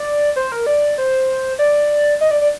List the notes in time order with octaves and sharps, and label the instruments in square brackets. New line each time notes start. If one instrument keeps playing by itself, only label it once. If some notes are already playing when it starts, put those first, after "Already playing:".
Already playing: [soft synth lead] D5
C5
A#4
D5
C5
D5
D#5
D5
D5